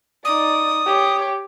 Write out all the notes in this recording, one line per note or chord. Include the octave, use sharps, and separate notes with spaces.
D#4 D5 D#6
G4 C#5